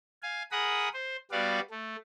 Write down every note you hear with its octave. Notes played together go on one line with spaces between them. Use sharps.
F5 G#5
G#4 A#4 F#5 B5 D#6
C5
G3 B3 F#4 D5 F5
A3